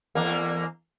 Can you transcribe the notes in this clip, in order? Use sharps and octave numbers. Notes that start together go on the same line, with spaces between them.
E2 A#3